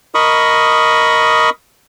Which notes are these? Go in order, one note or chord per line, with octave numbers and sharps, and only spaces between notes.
A#4 D#5 B5 C#6 D#6